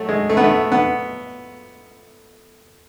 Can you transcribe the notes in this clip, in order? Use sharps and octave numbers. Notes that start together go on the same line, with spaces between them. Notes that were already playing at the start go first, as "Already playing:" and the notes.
Already playing: F#3 A3
G#3
A3
B3
A3
B3